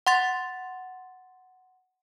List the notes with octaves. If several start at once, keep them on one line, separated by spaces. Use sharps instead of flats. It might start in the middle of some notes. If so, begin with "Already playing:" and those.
F#5 C6 A6